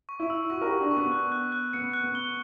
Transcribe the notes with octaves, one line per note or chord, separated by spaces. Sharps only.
C#6
E4
E6
F#4 C#6
A#4
G4 C#6
D4
C#6
B3
F#6
F#6
F#6
B3 C#7
F#6
B3
G7